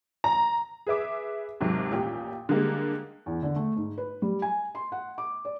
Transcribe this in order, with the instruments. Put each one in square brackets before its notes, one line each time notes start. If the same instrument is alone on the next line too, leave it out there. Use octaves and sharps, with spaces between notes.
[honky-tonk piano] A#5
G#4 B4 E5 D6
D#2 G#2 C3 F#3
A1 A#2 G4
D3 G3 G#3 A#3
[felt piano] E2
D3
A3
G#2
B4
G3
G#5
C6
F#5
D6
D5